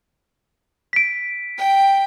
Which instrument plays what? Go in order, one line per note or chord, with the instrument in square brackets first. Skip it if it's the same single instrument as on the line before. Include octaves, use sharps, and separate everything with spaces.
[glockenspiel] B6 D7
[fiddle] G5